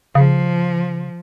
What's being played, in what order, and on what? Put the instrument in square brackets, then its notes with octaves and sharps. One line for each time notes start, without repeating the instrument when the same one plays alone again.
[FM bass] C#3 [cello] F3